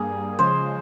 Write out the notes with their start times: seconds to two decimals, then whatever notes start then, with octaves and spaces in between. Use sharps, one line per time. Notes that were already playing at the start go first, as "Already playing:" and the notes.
Already playing: G2 G3 A#3 G#4
0.39 C#3 F3 G#3 C5